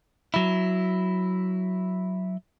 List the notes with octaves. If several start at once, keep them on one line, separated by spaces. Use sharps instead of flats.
F#3 E4